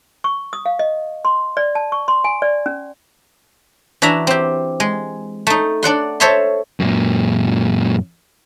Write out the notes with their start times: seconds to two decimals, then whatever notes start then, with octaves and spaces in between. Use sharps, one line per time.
0.24 C#6
0.53 D#6
0.66 F5
0.79 D#5
1.25 C6
1.57 D5
1.75 A5
1.92 C#6
2.08 C6
2.24 G#5
2.42 D5
2.66 C#4
4.02 E3 D4 F#4 E5 A#5
4.27 C4 G4
4.80 G#3
5.47 A3 D#4
5.83 D4 D5 F#5 C6
6.20 A4 C5 C#5 E5 A5 C6
6.80 F#2 A#2